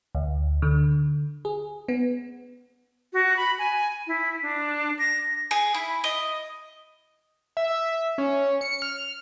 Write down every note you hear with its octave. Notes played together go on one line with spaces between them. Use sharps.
D2
D3
G#4
B3
F#4
B5
G#5
E4
D4
A#6
G#4
E4
D#5
E5
C#4
C#7
F6